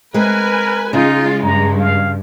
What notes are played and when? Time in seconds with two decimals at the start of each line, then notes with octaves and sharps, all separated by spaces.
0.14 G#3 C4 A#4 B4 G#5
0.93 C#3 G#3 D#4 F4
1.43 G2 A#5
1.79 F5